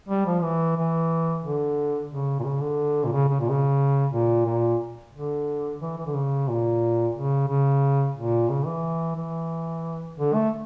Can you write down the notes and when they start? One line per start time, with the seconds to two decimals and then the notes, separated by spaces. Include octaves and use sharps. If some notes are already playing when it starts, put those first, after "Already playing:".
0.09 G3
0.26 F3
0.43 E3
0.77 E3
1.43 D3
2.11 C#3
2.40 A#2
2.44 C#3
2.61 D3
3.04 A#2
3.12 C#3
3.29 C#3
3.40 A#2
3.50 C#3
4.12 A#2
4.46 A#2
5.13 D3
5.81 E3
5.98 E3
6.06 D3
6.14 C#3
6.48 A#2
7.16 C#3
7.48 C#3
8.16 A#2
8.49 C#3
8.66 E3
9.16 E3
10.17 D3
10.34 A3